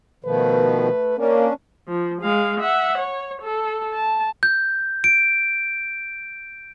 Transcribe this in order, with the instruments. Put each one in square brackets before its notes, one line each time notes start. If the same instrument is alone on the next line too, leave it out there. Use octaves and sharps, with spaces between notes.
[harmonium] B2 D#3 F3 [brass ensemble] A3 B4
[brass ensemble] A#3 [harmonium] C#4 D4
[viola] F3
G#3 F5
E5 F#5
C#5
A4
A5
[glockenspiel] G6
D7